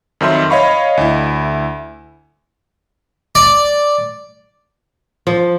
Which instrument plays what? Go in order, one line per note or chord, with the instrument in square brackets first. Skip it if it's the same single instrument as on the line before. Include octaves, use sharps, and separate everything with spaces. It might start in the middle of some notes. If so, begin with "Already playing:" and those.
[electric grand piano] F2 D#3 F#3 E5 C6
C#5 D#5 F5 B5 C#6
D2 E4
[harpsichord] D5
[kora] F3